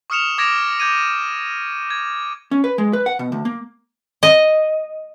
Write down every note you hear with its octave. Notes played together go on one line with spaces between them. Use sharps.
C#6 D#6 F6 C#7 E7 F7
D6 G#6 A#6 D7 E7 F7
D6 G6 G#6 D#7
G#6
C#4
B4
G#3
B4
F#5
B2
D2
A#3
D#5